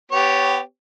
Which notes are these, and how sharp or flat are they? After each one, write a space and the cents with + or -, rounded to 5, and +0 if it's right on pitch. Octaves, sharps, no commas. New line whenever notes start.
B3 +25 G4 +0 C#5 +0